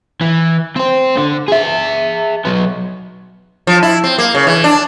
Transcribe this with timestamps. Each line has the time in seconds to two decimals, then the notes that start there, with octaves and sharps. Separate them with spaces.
0.21 E3
0.76 C4 C5
1.17 D3
1.48 G#4 E5
2.45 F#3 B3
3.67 F3
3.83 E4
4.04 C4
4.19 A#3
4.35 C#3
4.47 E3
4.64 D4